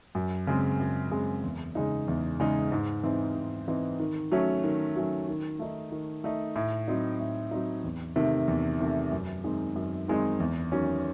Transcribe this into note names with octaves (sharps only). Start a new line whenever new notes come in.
F#2
C#3 G#3 C4
F#2
C#3 G#3 C4
E2
C#3 G#3 D#4
E2
C#3 G#3 D#4
G#2
E3 C4 D#4
G#2
E3 C4 D#4
D#3
F#3 A3 C#4
D#3
F#3 A3 C#4
D#3
A3 D#4
D#3
A3 D#4
A2
F#3 C4 D#4
A2
F#3 C4 D#4
E2
C3 D#3 A3
E2
C3 D#3 A3
F#2
D#3 G#3 C4 D#4
F#2
D#3 G#3 C4 D#4
E2
D#3 F#3 C#4